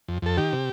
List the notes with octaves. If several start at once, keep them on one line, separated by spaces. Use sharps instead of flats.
F2
F2 A4
D#3 G4
C3